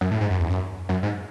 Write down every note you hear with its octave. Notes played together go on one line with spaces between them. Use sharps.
F#2
A2
G#2
F#2
E2
F#2
F#2
G#2